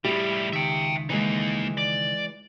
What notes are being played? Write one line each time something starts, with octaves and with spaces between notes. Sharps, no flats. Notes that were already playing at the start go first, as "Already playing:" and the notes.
A2 G3 E4 G4
C#2 D#3 E5 G5
E3 G#3 A#3 D#4
D5